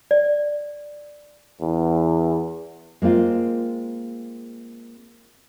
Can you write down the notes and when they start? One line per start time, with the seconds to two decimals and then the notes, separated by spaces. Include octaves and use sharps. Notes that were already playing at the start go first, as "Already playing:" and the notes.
0.11 D5
1.61 E2
3.02 G#3 A#3 C4 F4